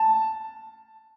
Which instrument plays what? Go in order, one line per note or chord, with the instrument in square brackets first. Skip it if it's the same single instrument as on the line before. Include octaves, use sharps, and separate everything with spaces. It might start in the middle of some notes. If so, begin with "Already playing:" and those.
Already playing: [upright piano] A5